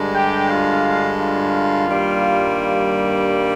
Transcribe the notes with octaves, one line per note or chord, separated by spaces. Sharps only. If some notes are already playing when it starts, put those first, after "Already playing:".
Already playing: G2 D3 G#3
G4 G5
F4 F5
F4 F5
G2 D#3 G3 A#3